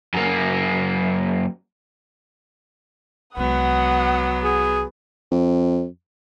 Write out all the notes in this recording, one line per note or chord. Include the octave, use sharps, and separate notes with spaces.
F#2 A#3
C2 F#3 G#3 B3 F#5 D#6
G#4
F2